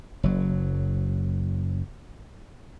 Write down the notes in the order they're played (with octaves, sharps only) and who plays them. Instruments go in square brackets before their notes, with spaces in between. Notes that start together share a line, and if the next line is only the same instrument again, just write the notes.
[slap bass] F#1 F#3